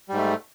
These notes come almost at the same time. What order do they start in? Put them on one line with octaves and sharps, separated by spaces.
G3 G#2 A3